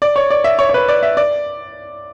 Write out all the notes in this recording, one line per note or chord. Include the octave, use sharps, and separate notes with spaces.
D5
C#5
D5
E5
C#5
C#5
B4
D5
E5
D5